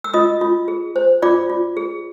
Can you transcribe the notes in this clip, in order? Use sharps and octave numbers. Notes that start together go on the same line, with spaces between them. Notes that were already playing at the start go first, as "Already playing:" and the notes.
E6
F4 D#5 D#6
F4
G#4
C5
F4 D5 D6
F4
G#4